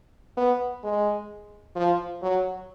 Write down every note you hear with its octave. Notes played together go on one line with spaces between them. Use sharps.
B3
G#3
F3
F#3